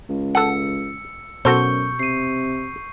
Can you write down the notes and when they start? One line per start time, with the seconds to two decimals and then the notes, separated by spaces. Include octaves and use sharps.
0.09 C#2
0.35 A4 F#5 E6 C#7
1.45 F#2 B2 F#4 A4 C5 C#6 G6 C#7
1.99 C3 C7 D#7